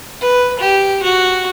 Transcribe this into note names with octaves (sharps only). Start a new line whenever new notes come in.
B4
G4
F#4